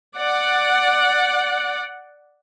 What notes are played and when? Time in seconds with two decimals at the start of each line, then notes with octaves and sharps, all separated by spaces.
0.17 D5 F#5